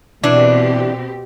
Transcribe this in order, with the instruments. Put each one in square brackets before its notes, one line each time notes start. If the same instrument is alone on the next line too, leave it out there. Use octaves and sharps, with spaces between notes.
[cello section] B2 C4 G4 [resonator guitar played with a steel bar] E3 D4